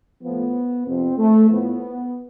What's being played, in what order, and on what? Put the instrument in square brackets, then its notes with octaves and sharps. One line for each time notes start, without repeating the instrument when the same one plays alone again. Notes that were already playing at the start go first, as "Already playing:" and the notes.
[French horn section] A2 F3 B3
F2 C3 F3 C4
A3
A2 F3 B3